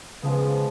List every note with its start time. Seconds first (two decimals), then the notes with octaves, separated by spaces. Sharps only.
0.22 C#3 F3 G#3 B3